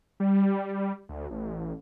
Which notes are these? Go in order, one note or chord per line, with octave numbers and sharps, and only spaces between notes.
G3
D2
A1